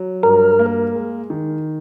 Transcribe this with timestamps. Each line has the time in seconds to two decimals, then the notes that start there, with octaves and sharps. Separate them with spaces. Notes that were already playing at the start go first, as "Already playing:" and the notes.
Already playing: F#3
0.23 G2 A#4
0.59 A#3
0.95 G#3
1.30 D#3